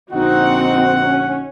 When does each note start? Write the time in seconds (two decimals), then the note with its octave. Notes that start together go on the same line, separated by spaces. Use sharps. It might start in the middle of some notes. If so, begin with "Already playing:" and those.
0.12 A#1 D3 C4 D#4 F#4 F#5
1.06 C#4